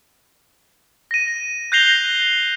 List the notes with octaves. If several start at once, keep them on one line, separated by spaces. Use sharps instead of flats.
A#6 D#7
F#6 G6 A#6 C7 F7 G7